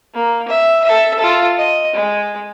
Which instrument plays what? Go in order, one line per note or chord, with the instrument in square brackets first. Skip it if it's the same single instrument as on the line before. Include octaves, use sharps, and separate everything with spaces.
[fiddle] A#3
E5
A4 E5
F4 A4
D#5
G#3